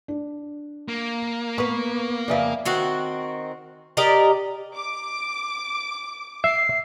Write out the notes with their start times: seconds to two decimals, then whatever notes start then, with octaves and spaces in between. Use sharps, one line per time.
0.08 D4
0.88 A#3
1.58 B3 B4 C#6
2.28 F2 C#3 B4 D5 E5 F5
2.65 D#3 C4 F#4
3.97 G4 A#4 D5 D#5
4.74 D6
6.44 E5 C7